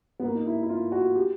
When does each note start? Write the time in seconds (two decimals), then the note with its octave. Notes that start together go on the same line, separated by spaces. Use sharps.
0.20 B3
0.23 A#3
0.35 D#4
0.46 E4
0.62 E4
0.69 F4
0.92 F#4
1.15 G4